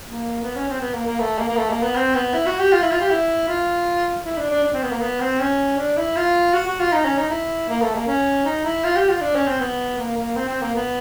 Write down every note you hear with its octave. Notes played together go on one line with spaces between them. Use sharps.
A#3
B3
C#4
C4
B3
A#3
A#3
A3
A#3
A#3
A3
A#3
B3
C4
B3
E4
F#4
G4
F4
E4
F4
G4
E4
F4
E4
D4
D4
D4
C4
B3
A#3
B3
C4
C#4
D4
E4
F4
F#4
F#4
F4
D#4
C#4
D#4
E4
A#3
A3
A#3
C#4
D#4
E4
F4
G4
F4
D4
C#4
C4
B3
A#3
A#3
C4
C4
A#3
B3